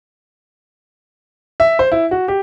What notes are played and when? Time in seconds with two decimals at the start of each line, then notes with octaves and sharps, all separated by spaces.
1.60 E5
1.79 C5
1.92 E4
2.11 F#4
2.28 G4